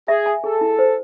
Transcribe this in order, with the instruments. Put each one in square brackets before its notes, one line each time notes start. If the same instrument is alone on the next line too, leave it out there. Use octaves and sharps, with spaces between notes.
[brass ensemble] G#4 [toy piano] E5
[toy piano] G#5
[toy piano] G#4 [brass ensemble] A4
[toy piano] E4
C5